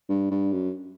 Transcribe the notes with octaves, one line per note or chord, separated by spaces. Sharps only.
G2
G2
F#2